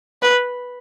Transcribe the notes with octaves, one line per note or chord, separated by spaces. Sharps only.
B4